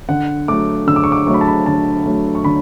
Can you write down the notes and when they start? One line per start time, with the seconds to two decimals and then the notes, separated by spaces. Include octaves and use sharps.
0.09 D3 F#5
0.48 F#3 A3 D6
0.87 D3 E6
0.96 D6
1.04 C#6
1.12 D6
1.27 F#3 A3 C#6
1.34 B5
1.41 A5
1.48 B5
1.66 D3 A5
2.06 F#3 A3
2.35 C#6
2.45 D3 B5